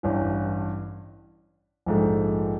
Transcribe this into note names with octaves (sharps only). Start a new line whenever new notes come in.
A1 G2 E3
A#1 G#2 F3 A3